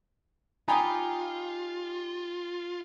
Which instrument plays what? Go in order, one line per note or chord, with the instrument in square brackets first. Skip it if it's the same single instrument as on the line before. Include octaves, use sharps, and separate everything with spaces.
[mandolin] D#4 G4 D#6 [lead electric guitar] F4 [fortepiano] G#5 A#5 B5